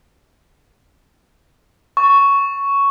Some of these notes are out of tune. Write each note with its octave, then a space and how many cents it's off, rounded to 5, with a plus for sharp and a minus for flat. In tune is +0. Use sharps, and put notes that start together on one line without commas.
C#6 +5